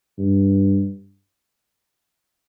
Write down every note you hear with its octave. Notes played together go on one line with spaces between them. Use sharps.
G2